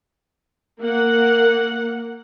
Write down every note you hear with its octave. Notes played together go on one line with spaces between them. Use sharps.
A#3 F#5